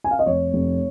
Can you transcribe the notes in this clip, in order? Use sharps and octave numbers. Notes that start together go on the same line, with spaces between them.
G#5
F5
D#5
F1 C#5
F1